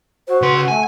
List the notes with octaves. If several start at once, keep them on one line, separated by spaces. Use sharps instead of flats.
F#4 C5
C#3 B4 C6
F#5
A3 G#5